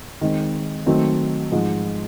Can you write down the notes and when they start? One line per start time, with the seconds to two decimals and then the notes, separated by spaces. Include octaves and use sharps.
0.21 D#3 G#3 C4
0.86 D#3 F#3 A3 C4
1.52 G#2 F3 G#3